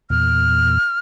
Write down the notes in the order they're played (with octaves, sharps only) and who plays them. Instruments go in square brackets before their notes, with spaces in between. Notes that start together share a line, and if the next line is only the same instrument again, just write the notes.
[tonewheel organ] E2 A#2 [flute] F6